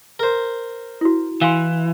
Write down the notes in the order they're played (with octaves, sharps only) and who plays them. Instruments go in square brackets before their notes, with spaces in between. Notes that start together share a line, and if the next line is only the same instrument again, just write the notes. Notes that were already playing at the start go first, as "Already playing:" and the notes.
[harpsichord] A#4 C5
[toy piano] E4 F#4
[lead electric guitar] E3 [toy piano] F5 G#5 C6